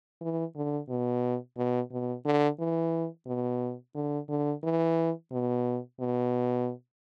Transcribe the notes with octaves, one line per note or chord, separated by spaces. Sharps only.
E3
D3
B2
B2
B2
D3
E3
B2
D3
D3
E3
B2
B2